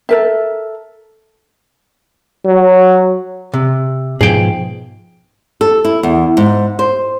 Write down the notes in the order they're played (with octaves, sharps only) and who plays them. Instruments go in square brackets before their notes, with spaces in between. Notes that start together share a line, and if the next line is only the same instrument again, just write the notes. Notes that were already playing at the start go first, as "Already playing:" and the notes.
[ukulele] A4 A#4 E5
[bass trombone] F#3
[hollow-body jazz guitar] C3
[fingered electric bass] G#2 B2 F3 [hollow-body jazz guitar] G#4 G5
[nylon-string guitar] A4
E4
E2
G#2
C5